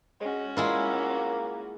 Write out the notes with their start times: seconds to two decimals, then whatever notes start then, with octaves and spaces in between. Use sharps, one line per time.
0.21 G#3 C#4 F#4
0.57 G#3 A#3 E4 F4